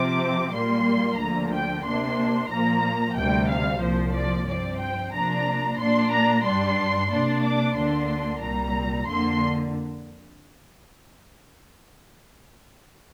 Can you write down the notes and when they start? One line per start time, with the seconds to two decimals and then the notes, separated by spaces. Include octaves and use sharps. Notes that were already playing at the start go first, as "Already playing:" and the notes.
Already playing: C3 F3 C4 D6
0.53 A#2 G3 A#3 C6
1.19 D2 D3 F3 A#3 A#5
1.53 G5
1.85 C3 A#3 D4 C6
2.50 A#2 F3 A#3 A#5
3.16 D2 C3 G3 G5
3.50 F5
3.82 C2 A#2 F3 C5
4.15 D5
4.48 G2 F3 C4 D5
4.80 G5
5.13 C3 F3 A#3 D4 A#5
5.79 A#2 A#3 D4 C6
6.12 A#5
6.44 G2 G3 D4 C6
7.10 C3 A#3 D4 C6
7.44 D6
7.76 D2 D3 A#3 D4 C6
8.41 C2 A#2 G3 A#5
9.07 F2 D3 A#3 C6